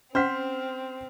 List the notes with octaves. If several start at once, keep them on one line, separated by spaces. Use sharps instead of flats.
C4 C#4 C5 F#5 C6 F6 B6